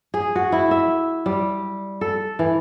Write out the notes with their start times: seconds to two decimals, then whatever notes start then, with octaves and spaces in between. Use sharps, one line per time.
0.14 G#4
0.35 F#4
0.52 E4
0.71 E5
1.26 G3
2.01 A4
2.39 E3